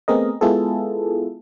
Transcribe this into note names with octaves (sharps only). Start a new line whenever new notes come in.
A3 B3 C4 G#4 A#4 D#5
G#3 B3 E4 F4 G#4 A4